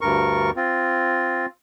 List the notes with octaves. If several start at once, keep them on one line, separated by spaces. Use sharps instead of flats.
D2 G2 A#4 C#6
C4 F4